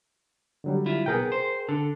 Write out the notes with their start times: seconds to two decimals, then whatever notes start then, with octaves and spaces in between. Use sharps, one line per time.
0.64 D3 F#3 G3
0.86 E4 F4
1.06 B1 B3 G#4 A#4 G5
1.32 C5
1.69 D3 A4